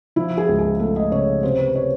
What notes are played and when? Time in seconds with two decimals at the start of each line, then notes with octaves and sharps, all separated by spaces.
0.16 F3 E4
0.38 G#4
0.49 C#2
0.59 G#4
0.80 A3 A4
0.96 D#5
1.12 C#3 C#5
1.43 C3 C5
1.59 B4
1.75 C#5